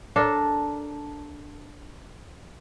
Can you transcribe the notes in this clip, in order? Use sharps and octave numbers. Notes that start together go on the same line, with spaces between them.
D4 A4 A#4